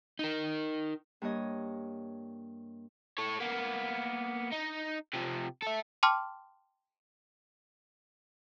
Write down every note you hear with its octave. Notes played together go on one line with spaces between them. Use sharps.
D#4 A#4
G2 A#3 C#5 D#5
A4 C#5
A#3 B3
D#4
C3 F3
A4 E5
G5 A5 C6 D6 F6